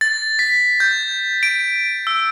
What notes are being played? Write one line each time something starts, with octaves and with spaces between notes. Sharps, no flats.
A6
B6
G6
D7
E6